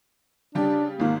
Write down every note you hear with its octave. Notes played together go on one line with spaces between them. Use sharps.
C#3 G3 D4 G4
G#1 D#3 A#3